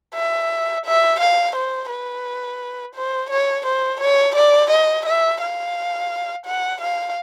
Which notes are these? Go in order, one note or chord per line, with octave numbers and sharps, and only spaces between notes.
E5
E5
F5
C5
B4
C5
C#5
C5
C#5
D5
D#5
E5
F5
F#5
F5